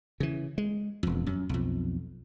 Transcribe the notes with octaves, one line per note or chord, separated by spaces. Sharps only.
C#3 E3
G#3
E1 F2
F#2
B1 F2